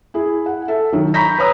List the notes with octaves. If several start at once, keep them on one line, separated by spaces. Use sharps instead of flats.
E4 G#4
F#5
A4 E5
D#3 F#3
A#5 B5 C#6 G6 A#6 B6
B4 C#5 A#5 D#6 E6